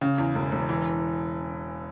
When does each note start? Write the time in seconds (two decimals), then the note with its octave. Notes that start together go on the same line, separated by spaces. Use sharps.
0.01 C#3
0.18 E2
0.35 E1
0.52 E1
0.69 E3